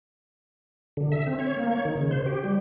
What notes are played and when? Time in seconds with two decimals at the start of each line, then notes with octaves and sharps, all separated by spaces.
0.97 D3
1.12 E5
1.26 C4
1.39 C#5
1.57 A#3
1.71 C#5
1.85 D#3
1.98 C#3
2.11 C5
2.26 G4
2.44 G3